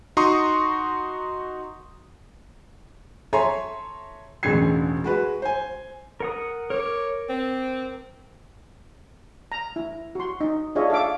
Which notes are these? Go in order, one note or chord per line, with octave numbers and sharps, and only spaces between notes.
D#4 F#4 A#5 C6 C#6 D#6
A4 C#5 E5 G#5 A#5 C6
E1 A1 D3 G#3 G#6 C7
G#3 F#4 B4
C5 G#5
A#4 F#5 D#6
A#4 C#5 D6
C4
A#5
E4
F#4 C6
D#4
D4 F4 G#4 C#5 D#5 E5
A4 E5 F5 D6